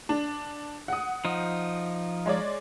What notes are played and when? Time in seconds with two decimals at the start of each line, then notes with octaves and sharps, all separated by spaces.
0.09 D4
0.88 F#5 D#6
1.25 F3 D#4
2.26 G#3 C#5 D5